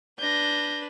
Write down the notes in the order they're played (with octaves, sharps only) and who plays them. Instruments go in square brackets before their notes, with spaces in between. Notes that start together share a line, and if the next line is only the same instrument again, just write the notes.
[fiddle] D4 B4 [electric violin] G6 A#6